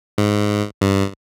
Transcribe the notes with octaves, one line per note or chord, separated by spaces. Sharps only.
G#2
G2